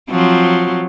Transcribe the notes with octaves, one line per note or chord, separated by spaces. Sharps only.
F3 F#3 C4